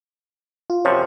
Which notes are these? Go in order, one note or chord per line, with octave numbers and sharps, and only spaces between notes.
F4
F#2 C3 F3 C#5 C#6